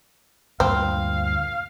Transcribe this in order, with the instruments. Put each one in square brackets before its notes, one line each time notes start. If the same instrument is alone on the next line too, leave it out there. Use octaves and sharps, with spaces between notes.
[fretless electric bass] D2 G2 A#2 [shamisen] C4 [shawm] F5